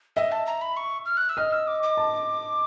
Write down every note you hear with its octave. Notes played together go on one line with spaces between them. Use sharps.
D#5 E5
A5
A#5
B5
C#6
F6
F#6
E6
D#5 F6
E6
D6
D6
A5